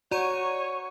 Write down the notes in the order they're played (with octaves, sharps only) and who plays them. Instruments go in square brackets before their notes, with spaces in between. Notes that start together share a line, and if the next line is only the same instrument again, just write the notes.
[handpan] F#4 [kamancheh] C#5 [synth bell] D5 A#5 D#7